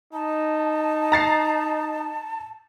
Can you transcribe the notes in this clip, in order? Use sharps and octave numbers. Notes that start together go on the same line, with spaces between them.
D#4 A5
A#5 A6 C7